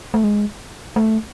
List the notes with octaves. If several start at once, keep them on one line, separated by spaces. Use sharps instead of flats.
A3
G#3
A3